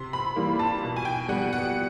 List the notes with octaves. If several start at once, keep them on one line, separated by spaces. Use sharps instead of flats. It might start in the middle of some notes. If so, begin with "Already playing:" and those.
Already playing: C3 C6
B5
E3 G3 A#3
A5
B2
G#5
G5
G3 B3 F#5
F#5